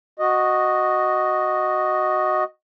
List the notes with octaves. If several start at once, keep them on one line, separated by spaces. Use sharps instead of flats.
F#4 D#5